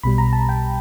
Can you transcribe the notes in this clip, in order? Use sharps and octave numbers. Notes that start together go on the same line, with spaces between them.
B1 B2 G3 B5
A#5
A5
G5